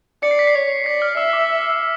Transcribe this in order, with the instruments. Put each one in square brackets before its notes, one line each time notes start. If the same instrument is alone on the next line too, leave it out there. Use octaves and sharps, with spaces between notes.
[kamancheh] D5 [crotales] C#7
[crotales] C7
B6
C7
[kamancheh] C#5
[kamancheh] D5 [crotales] B6
[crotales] F6
[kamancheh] E5 [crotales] E6
[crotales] D6